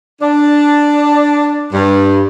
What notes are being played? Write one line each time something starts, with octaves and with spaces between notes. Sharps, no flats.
D4
G2